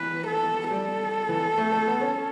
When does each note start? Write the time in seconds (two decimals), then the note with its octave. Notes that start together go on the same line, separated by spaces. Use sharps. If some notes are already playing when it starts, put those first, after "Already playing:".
Already playing: E3 B4
0.27 A4
0.71 G3 A4
1.29 E3
1.58 A3
1.72 A3
1.87 B3
2.01 C#4